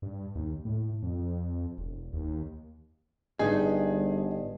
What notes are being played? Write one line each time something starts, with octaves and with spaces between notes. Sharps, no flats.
G2
D#2
A2
F2
E1
D#2
G1 G2 D#4 G4 G#4 D#5